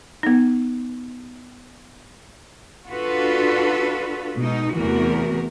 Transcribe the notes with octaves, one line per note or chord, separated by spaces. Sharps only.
B3 D#4
D4 F4 F#4 A4 B4
B2 G#3 D#4
E2 C3 E3 A3 F#4 A#4